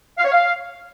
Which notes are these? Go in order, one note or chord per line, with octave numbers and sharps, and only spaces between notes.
F5
C#5
F5